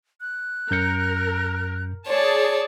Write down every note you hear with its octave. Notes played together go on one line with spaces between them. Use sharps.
F#6
F#2 A#4 G6 C#7
G#4 C#5 D5 A5